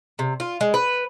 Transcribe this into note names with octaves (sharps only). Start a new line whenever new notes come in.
C3
F4
G#3
B4